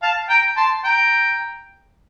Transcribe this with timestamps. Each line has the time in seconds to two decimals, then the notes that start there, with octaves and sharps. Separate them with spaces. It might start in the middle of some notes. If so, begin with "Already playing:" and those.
0.02 F5 A5
0.30 G5 A#5
0.57 A5 C6
0.84 G5 A#5